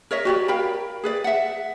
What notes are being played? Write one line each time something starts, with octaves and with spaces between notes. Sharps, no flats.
A#4 C#5 D#5 E5
F#4 G4 D5
A#4 F5 G5 B5
G#4 B4 D5
E5 F#5